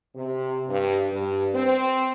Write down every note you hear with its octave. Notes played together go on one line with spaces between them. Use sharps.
C3
G2
G2
C4